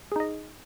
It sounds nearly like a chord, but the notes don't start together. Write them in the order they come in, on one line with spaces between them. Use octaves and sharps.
G#4 D#4 D#5